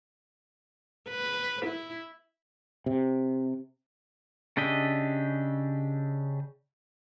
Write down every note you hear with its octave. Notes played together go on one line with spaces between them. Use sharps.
B4
E4
C3
C#3 D4 G4 D#5 E5